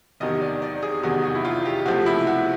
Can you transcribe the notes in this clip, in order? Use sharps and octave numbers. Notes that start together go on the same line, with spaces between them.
F1 E2 C3 D#3 F#3 D#5
D5
D5
G#4
F1 E2 C3 D#3 F#3 F#4
F#4
E4
F4
G4
C#2 C3 F3 A3 F#4
E4
F#4